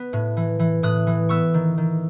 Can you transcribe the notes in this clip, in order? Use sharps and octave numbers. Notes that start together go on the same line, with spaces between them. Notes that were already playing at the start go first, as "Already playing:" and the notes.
Already playing: B3
A2
E3
E3
A2 D#6 F#6
E3
B3 C#6 E6
D#3
D#3